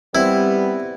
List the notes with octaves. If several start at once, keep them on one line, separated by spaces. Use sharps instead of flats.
G3 B3 C4 E4